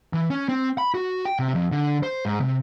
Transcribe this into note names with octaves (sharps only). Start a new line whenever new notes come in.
E3
C#4
C4
B5
F#4
G5
C3
F2
D3
C5
G#2
C3